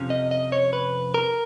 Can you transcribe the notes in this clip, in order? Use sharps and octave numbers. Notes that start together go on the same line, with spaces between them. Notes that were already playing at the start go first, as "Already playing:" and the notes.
Already playing: F2 C3 F3 C#4
D#5
D#5
C#5
B4
A#4